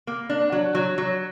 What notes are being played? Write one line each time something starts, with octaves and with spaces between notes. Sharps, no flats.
A#3
D4
F#3
F#3
F#3